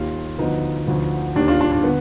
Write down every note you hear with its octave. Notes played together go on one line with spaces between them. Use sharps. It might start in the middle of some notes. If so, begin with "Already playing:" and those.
Already playing: D#2 D#3 F4
D2 D3 F3 B3 D#4
D2 D3 F3
D#2 D#3 D4
D4 F4
D4 F4
D4
D3 B3